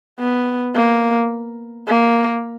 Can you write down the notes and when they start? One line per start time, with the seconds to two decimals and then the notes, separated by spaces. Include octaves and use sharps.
0.19 B3
0.75 A#3
1.88 A#3